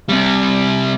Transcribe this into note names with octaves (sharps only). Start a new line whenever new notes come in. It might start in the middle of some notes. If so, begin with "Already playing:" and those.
C3 G3